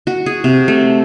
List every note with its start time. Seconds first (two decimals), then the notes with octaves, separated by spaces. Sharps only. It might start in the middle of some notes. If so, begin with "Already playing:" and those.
0.07 F#4
0.26 G#4
0.44 C3
0.68 A3